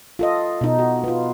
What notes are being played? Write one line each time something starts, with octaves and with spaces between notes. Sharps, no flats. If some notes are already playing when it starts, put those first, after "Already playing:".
F4 A4 D#5
B2 D#4
F#4
B3 F4